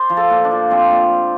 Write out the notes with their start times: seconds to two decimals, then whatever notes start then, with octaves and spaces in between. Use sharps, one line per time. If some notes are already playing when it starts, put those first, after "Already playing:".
Already playing: C5 D5
0.10 F3
0.17 A4
0.30 A#2
0.45 D4
0.51 F3
0.70 F3 C4
0.90 A#2